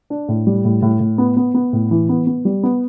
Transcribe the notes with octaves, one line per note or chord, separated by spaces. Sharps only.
D4
A2
G3
A2
A2
A2
B3
B3
B3
A2
E3
B3
B3
G3
B3